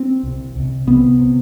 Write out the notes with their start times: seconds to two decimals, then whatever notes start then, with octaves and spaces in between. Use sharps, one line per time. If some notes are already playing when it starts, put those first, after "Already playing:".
Already playing: C4
0.23 C2 C3
0.56 C2 C3
0.87 C2 C3 B3
1.19 C3